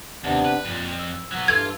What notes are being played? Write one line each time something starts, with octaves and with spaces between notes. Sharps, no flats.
D#2 C3 B3 D4
B4
F2 A#2
E6
F#3 B3
G2 E3 F4 A4 G#6